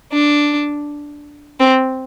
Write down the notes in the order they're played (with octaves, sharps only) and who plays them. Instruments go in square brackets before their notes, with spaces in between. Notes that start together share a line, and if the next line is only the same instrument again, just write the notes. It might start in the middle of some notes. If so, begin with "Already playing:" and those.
[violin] D4
C4